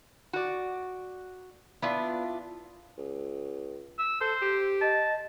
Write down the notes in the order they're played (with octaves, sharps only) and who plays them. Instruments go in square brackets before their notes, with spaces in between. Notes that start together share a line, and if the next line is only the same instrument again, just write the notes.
[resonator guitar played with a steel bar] F#4 D5
[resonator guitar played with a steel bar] B3 [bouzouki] D4 E4 F4
[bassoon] C#2
[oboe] E6
[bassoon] A4 [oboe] C5
[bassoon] G4
[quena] D#5 [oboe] A5